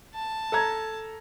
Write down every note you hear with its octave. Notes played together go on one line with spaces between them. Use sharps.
A5
A4 A#5 G#6